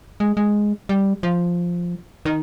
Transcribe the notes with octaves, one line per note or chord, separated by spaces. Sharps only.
G#3
G#3
G3
F3
D#3